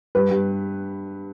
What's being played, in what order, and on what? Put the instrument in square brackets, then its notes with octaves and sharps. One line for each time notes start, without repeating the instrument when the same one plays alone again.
[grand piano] G2 [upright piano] B4
[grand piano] G2